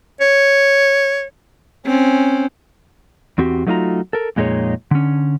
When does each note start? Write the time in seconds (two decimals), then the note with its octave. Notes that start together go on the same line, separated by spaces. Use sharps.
0.21 C#5
1.86 C4 C#4
3.38 E2 C4 F#4 G4
3.66 F#3 A3 D#4 F4 F#4 A#5
4.13 A4 A#4
4.36 F2 A#2 G#3 D#4 G#4 C#5
4.91 D3 C#4